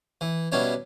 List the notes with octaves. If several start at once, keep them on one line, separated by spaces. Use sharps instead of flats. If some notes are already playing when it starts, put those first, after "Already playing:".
E3
B2 G3 C#4 D4 E4 C#5